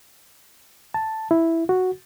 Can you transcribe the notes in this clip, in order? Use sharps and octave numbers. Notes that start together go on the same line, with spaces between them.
A5
E4
F#4